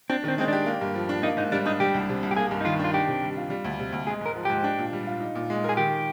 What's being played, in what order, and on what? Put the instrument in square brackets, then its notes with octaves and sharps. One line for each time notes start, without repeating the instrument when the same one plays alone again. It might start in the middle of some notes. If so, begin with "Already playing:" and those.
[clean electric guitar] C4 [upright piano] D4
[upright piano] D#3 [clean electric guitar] C4
[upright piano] G#3 [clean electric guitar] C4
[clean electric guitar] D4 [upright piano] G4
[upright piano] A#3
G2
F3
D4
[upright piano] A#3 [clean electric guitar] D#4
[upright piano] G#2 [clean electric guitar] D#4
[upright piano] G3 [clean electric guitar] D4
[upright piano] D4 [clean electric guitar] D#4
[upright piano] G3 [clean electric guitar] G4
[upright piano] C2
C3
C2
[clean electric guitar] G4
[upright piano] A#3 [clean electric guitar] G#4
[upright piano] G2
[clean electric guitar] D#4
[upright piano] D#3 [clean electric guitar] F4
[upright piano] D4 [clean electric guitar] F4
[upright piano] D4 [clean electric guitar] G4
[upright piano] C3
G3
F4
G3
D2
C3
D2
[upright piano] G#3 [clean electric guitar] G#4
[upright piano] G#2 [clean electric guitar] A#4
[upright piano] F3
[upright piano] G#2 [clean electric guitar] G4
[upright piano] D4
A#2
G3
F4
D#4
A#2
G#3
[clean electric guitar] G#4 [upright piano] A#4
[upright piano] D#3 [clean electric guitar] G4